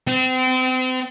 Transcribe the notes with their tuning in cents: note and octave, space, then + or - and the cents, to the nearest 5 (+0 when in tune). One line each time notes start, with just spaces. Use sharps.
C4 -35